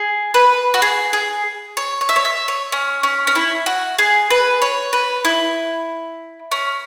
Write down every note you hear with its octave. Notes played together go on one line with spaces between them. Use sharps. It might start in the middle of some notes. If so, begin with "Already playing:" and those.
Already playing: G#4
B4
F#4
G#4
G#4
C#5
C#5
E5
C#5
E5
C#5
C#4
C#4
C#4
E4
F#4
G#4
B4
C#5
B4
E4
C#4